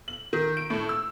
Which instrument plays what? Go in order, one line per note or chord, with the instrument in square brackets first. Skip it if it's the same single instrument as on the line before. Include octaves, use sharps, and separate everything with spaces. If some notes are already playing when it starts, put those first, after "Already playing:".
[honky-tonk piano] F#7
D#3
D7
A2
E6